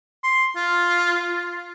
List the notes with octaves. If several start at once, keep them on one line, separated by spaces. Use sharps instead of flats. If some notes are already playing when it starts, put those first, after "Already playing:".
C6
F4